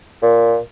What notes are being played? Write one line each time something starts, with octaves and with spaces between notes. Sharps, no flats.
A#2